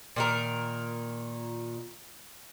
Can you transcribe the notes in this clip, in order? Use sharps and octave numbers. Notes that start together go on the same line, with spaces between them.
A#2 D#3 A#4